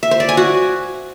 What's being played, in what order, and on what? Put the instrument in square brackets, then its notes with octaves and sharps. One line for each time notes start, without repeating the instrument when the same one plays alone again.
[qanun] E5
C5
D5
G#5
F#4